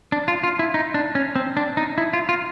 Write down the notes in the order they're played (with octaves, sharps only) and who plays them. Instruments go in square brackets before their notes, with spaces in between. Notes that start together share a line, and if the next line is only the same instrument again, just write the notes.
[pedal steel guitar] D4
F4
F4
E4
D#4
D4
C#4
C4
D4
D#4
E4
F4
F4